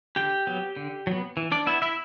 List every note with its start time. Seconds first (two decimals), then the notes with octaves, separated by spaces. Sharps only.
0.16 D3 G4 G5
0.47 F#3 B3
0.77 D3
1.07 F#3 B3
1.37 E3
1.52 D4 D5
1.67 B3 E4 E5
1.82 E4 E5